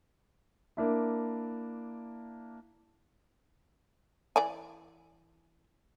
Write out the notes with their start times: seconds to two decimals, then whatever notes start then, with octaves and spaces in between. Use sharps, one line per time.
0.77 A#3 D4 E4
4.36 E3 D5 G#5